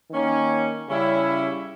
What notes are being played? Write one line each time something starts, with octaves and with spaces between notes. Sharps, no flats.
D#3 A#3 C#4
C#3 G3 C#4 E4